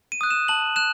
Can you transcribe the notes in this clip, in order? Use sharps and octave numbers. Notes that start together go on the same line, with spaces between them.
D#7
D#6 F#6
E7
A5 F#7
F#6 E7